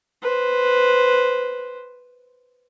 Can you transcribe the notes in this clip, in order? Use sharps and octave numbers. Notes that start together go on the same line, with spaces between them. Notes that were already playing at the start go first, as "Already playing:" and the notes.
B4 C5